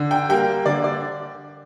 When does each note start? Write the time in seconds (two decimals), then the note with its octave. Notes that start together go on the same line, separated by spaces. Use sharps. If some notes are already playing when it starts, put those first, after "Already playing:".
Already playing: D3
0.11 G5
0.29 G3 A#3 G5
0.66 D3 D5
0.84 D5